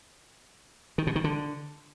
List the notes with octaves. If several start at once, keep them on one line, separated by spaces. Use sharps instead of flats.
D#3
B2
D#3
D3